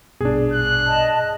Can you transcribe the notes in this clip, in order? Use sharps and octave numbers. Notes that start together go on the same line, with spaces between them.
A#1 G2 B2 D4 G#4
F#6
D#5 A5